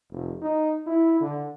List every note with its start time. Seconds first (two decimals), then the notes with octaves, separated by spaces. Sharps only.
0.11 F1
0.41 D#4
0.86 E4
1.21 D3